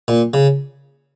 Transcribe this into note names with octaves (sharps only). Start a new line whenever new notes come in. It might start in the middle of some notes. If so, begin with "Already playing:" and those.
A#2
C#3